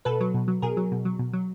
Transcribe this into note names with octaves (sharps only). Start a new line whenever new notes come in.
B2 A4 B4
F#3
B2
F#3
B2 G#4 A#4
F#3
B2
F#3
B2
F#3